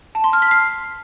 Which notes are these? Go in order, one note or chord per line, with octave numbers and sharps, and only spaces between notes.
A5
C6
F6
B6
C7